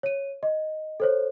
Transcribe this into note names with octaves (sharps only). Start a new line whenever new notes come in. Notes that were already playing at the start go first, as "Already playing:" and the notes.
C#5 D#7
D#5
A4 C5 C#5